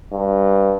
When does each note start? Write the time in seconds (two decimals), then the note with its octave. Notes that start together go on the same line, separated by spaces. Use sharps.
0.13 G2